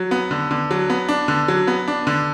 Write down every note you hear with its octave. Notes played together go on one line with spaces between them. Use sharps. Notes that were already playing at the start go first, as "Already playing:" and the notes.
Already playing: F#3
B3
D3
D3
F#3
B3
D4
D3
F#3
B3
D4
D3